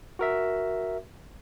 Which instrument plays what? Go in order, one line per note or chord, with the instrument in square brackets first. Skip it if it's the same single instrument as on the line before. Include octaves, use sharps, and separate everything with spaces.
[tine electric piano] F#4 A#4 E5